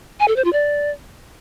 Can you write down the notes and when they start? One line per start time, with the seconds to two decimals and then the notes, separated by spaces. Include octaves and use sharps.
0.20 G#5
0.28 A4
0.36 C5
0.45 F4
0.53 D5